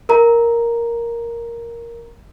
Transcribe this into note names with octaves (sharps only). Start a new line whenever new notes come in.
A#4 A#5